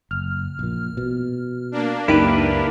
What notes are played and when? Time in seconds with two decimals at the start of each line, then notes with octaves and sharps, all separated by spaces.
0.11 F#1 F6
0.59 A#1 A#2
0.97 B2
1.72 A#3 D4
2.08 C#2 F#2 D#4 E4 G4 A#4 B4